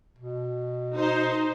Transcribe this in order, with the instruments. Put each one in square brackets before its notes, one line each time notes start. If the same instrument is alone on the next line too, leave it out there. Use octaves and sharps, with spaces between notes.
[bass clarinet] B2
[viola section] D#4 C5